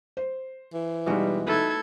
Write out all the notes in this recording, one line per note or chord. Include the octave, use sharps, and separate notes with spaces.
C5
E3
B2 G3 G#3 D#4 F#4
A3 D#4 E4 A4 B4 G#6